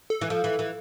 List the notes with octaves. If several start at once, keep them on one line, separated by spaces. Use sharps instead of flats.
A4
E3
F3
E3
E3